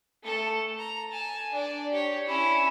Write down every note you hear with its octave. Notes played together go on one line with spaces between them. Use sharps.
A3 A4
A#5
G#5 A5
D4 D5
G4 C#5
C#4 E4